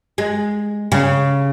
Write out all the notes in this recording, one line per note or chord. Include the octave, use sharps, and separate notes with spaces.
G#3
C#3